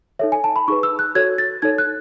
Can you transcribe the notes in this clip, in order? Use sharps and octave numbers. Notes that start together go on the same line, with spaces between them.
D#4 A4 C#5 E5
G#5
A5
B5
D#4 G#4 B4 C#6
E6
F#6
F#4 A4 C#5 G#6
A6
D#4 A4 C#5 G#6
F#6